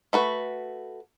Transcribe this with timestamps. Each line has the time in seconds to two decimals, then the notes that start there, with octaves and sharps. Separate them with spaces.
0.13 A3 F#4 B4